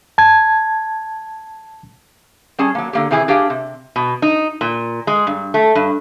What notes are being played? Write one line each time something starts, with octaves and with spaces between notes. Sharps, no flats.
A5 G#6
G3 C#4 G#4 A5
F#3 A#3
D3 A#3 G4
C3 E3 E4 G#4 G#5
D4 G4 G#4 F5
C3
B2
D#4
A#2
G#3
G2
A3
G2